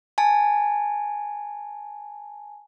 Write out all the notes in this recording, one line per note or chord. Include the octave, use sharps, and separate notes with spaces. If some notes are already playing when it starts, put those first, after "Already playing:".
G#5 A5